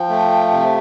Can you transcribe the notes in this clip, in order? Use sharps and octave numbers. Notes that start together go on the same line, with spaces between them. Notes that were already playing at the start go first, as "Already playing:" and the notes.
Already playing: F3 G5
A3
C3